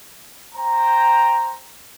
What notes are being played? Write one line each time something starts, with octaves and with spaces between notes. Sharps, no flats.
C5 G5 A#5